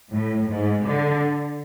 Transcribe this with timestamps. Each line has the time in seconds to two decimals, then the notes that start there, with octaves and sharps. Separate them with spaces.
0.12 A2
0.49 G#2
0.86 D3